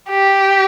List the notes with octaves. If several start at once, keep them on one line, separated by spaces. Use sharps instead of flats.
G4